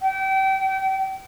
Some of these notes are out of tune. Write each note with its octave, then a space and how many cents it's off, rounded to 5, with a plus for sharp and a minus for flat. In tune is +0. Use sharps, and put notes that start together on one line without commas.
G5 -30